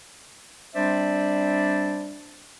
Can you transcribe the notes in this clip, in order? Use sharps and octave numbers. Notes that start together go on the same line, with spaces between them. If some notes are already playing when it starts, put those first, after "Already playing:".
G3 C4 D4 C5 D5 E5